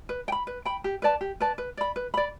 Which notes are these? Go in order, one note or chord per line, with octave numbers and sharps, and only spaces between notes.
B4
G5
B5
B4
G5 B5
G4
B4 D5 A5
G4
B4 D5 A5
B4
D5 B5
B4
D5 B5